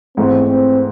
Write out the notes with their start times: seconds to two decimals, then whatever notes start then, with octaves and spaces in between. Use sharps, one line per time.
0.17 G#2 E3 A3 C4
0.48 C4